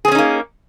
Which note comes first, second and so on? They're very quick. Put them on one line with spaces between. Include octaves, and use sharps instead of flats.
G#4 C4 C#4 D#4 A#3